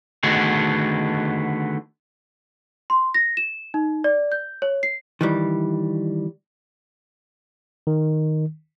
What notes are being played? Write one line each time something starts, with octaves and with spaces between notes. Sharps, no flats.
D3 D#3 A3 B3 F#4 G#4
C6
A#6
E7
D#4
D5
G6
C#5
C7
D#3 E3 G3
D#3